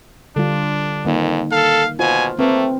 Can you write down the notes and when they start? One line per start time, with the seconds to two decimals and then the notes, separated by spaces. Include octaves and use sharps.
0.36 D3 G3 D4 F4
1.05 F2 D#3 A#3 D#4
1.52 A4 F5
1.99 B2 F4 C5 G#5
2.39 A3 A#3 C4 B4